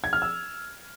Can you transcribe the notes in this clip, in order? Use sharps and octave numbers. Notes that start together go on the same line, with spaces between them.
G#6
F6
E6